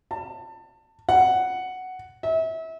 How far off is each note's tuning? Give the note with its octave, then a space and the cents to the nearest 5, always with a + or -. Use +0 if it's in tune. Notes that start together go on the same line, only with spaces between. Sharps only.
A5 +25
F#5 +5
E5 -30